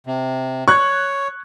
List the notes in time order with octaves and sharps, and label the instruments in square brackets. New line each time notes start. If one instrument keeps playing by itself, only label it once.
[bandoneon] C3
[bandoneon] C#5 [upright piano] C#6 F#6 G#6